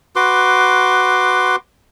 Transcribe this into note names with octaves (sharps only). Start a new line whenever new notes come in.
F#4 B4 C6 D6